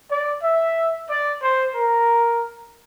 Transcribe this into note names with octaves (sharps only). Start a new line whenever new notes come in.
D5
E5
D5
C5
A#4